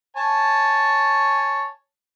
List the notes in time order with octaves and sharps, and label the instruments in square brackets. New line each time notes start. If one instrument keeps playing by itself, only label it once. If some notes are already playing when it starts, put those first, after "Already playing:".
[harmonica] C#5 G#5 A5